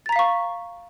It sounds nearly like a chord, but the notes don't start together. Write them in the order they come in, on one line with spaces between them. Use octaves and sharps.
A6 A#5 B6 F5 C#6